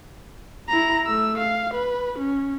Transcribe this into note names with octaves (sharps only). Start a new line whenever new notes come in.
E4 A#5
A3 E6
F5
B4
C#4